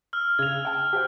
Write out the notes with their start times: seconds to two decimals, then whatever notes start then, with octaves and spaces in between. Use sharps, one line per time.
0.13 E6 F6
0.39 C#3 G#6 F7
0.65 G5 A5
0.93 G4 C5 G5